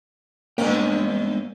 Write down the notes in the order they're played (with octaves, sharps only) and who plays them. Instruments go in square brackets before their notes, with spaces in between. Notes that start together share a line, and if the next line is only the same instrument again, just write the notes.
[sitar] G2 C#4 [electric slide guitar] G#3 B3 G5 [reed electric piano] A#3